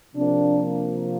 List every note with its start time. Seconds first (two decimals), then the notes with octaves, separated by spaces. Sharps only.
0.16 C3 F3 A#3 D4